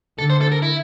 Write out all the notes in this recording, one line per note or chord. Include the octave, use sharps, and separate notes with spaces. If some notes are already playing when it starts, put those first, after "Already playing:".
D3 A4
C5
A4
A#4
E4